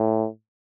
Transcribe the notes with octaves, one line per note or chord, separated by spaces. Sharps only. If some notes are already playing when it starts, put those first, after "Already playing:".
Already playing: A2